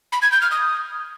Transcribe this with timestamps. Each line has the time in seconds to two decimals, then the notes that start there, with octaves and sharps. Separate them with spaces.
0.12 B5
0.22 G#6
0.32 G6
0.42 F6
0.51 D#6